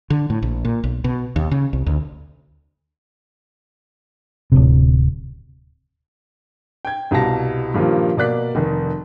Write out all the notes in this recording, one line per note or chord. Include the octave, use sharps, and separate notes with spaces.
D3
A2
A#1
A#2
B1
B2
D#2
C#3
C2
D2
D1 G1 C3
G5 G#6
C2 B2 G3 F5 A5 A#6
G2 A#2 D#3 F3 G3
B2 A#3 D5 F#6 B6
F1 D#3